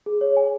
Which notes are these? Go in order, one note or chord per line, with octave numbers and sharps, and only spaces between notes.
G#4
C#5
G#5